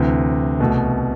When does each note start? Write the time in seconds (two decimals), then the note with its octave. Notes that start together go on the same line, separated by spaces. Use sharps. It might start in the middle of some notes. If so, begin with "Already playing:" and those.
Already playing: D2 C3 E3
0.60 C2 B2 A3